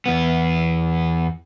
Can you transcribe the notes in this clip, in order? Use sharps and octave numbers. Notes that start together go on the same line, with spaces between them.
E2 B3